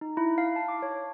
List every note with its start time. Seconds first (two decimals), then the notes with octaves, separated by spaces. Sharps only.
0.01 D#4
0.17 E4
0.38 F5
0.56 A5
0.68 D6
0.82 C#5